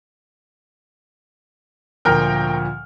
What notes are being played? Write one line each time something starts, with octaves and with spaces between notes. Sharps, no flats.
D2 A#2 F3 A#4 G5 F6